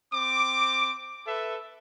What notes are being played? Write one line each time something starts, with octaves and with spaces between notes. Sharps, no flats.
C4 D6
A4 B4 E5